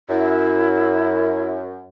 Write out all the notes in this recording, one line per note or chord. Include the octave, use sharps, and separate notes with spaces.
F#2 E4